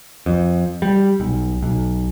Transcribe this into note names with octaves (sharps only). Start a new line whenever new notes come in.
F2
G3
B1
B1